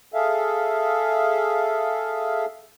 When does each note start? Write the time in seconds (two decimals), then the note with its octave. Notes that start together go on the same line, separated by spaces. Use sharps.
0.14 G#4 A4 E5 F5